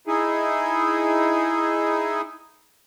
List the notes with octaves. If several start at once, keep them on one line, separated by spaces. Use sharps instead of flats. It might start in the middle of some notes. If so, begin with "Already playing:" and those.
D#4 E4 G#4